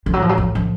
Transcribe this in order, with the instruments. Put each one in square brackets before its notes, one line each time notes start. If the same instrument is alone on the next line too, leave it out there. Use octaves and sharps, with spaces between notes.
[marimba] A2 [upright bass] F3
[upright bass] F#3
F3
F#3
F3
F3